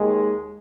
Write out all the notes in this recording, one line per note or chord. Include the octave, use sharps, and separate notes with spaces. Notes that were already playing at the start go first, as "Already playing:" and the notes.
Already playing: D#2 D#3 G#3